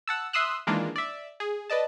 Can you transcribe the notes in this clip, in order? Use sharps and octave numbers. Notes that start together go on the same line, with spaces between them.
F#5 A5 E6
E5 C6 D#6 E6 F#6
D#3 E3 G#3 A#3 D4 F4
D5 E5
G#4
B4 D5 D#5 A5